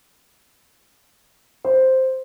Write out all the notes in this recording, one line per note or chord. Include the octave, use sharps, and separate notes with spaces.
C5